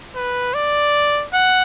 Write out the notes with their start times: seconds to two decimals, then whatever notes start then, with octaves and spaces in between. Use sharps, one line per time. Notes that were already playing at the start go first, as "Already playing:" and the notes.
0.15 B4
0.54 D5
1.33 F#5